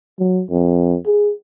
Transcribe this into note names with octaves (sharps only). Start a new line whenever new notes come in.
F#3
F2
G#4